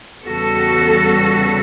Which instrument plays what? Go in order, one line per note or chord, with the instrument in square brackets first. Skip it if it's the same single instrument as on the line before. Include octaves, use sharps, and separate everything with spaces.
[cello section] E2 C#3 G3 B3 F#4 A4